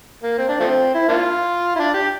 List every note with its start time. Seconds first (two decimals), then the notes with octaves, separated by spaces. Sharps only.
0.22 A#3
0.38 C4
0.49 D4
0.60 F3 A3 C4
0.94 E4
1.09 A#3 D4 F4
1.76 E4
1.79 D4
1.94 G4